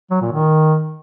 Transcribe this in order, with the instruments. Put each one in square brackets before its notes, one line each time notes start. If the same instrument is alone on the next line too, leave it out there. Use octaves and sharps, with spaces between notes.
[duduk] F#3
A#2
D#3